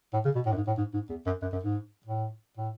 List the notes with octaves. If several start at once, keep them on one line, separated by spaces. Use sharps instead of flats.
A2
C#3
B2
A2
F#2
G#2
A2
G#2
G#2
E2
F#2
F#2
F#2
G#2
A2
A2